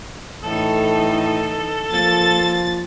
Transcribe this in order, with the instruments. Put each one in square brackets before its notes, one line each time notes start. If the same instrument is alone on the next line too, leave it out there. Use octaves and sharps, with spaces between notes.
[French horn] A2 [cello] E3 D#4 [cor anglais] A4
[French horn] F3 [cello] A#3 [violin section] A6